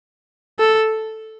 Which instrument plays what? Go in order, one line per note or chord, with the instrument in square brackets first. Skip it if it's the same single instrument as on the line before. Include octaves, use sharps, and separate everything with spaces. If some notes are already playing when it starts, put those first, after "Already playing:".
[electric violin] A4